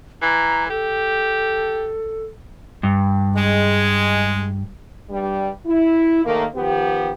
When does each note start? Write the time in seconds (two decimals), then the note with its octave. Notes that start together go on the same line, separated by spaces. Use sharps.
0.22 E3 A#5
0.70 G4 A4
2.83 G2
3.36 G#3
5.10 G2 G3
5.66 E4
6.25 D#2 D#3 A3 A#3
6.55 D#3 F3 B3 G4